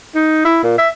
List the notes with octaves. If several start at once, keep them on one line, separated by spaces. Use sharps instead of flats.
D#4
E4
A#2
E5